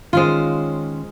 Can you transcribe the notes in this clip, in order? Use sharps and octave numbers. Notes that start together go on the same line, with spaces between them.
D#3 G#3 C#4 F4 C5